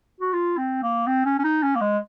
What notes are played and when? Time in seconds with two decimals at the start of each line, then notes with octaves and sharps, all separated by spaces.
0.20 F#4
0.33 F4
0.57 C4
0.83 A#3
1.07 C4
1.26 C#4
1.39 C#4
1.44 D#4
1.63 C#4
1.76 A#3
1.81 G#3